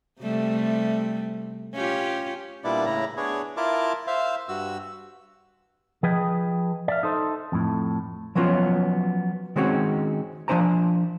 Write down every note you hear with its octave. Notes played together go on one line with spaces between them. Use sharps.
C3 G3 A3
C#4 F4 G4
A#2 G3 B3 D4 E4 D5
A2 C#3 E4 A#5
B3 D4 G#4 C#5
E4 F4 A#4 A5 D6
C5 E5 F5
G2 F#4 E6
F3 G#4 B4 D#5 G5
D5 E5 F5
D#4 A4 C5
F2 A2
F3 F#3 B3 C#4 F4
D#3 G#3 C4 C#4 F#4
F3 A#3 D4 C5 G#5 A#5